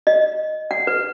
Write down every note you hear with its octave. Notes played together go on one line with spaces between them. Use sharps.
D#5
F#5
B4